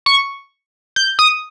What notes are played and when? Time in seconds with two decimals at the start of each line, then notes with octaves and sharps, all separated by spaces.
0.06 C#6
0.96 G6
1.19 D#6